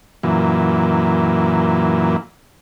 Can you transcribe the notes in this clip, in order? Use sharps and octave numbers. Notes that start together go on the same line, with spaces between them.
F#2 A#2 E3